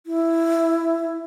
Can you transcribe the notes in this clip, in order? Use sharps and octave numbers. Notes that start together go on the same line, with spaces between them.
E4